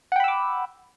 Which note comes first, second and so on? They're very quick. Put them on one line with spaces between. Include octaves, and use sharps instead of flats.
F#5 G5 B5 E6 D6